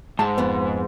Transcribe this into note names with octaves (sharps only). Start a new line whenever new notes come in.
G#2 A5
F2 B3